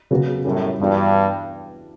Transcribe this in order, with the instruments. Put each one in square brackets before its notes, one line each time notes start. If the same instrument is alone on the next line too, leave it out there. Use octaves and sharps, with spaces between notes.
[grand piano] C#3 F#3 B3 F#4
[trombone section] F#2 A2 [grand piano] G3 C#4 F#4
[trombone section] G2 [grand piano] E3 B3 D4 F#4